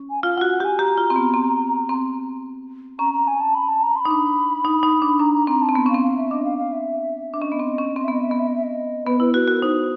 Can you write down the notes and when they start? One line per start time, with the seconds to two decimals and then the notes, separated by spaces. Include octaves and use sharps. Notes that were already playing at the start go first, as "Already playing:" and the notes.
Already playing: C#4
0.10 G#5
0.23 F4 F5
0.37 F4 F#5
0.41 F#4
0.50 F#5
0.60 G4 G#5
0.79 G4 A#5
0.98 F4
1.10 C4
1.16 B3
1.34 C4
1.89 C4
2.99 C#4 A#5
3.13 A#5
3.27 G#5
3.41 A5
3.55 B5
3.69 A5
3.83 A#5
3.96 C6
4.00 B5
4.05 D#4
4.10 D4
4.65 D#4
4.83 D#4
5.02 D4
5.20 D4 A#5
5.34 A#5
5.47 C4 A#5
5.62 A5
5.69 C4
5.75 B3
5.86 C#4
5.90 F5
5.94 C4
6.03 F5
6.17 E5
6.30 D4 D#5
6.44 F5
6.58 F5
6.72 E5
7.34 D4
7.41 C#4 D#5
7.52 B3
7.59 C4
7.78 C#4
7.96 C4 D#5
8.04 E5
8.08 B3
8.13 D#5
8.22 E5
8.30 B3 D#5
8.39 E5
8.47 D#5
8.56 E5
8.64 D#5
9.06 B3 B4
9.20 E4 B4
9.34 F#4 B4
9.48 F#4 A#4
9.62 D#4 C5